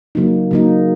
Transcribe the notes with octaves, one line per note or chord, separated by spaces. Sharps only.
C#3 F#3 A#3 D#4
C#3 F#3 A#3 D#4